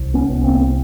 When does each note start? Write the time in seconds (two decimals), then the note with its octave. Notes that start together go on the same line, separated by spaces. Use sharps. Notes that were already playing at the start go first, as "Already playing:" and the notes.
Already playing: C2
0.14 B3 C#4
0.29 C2
0.43 A#3 C4